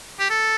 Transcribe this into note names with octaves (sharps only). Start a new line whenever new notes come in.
G4
A4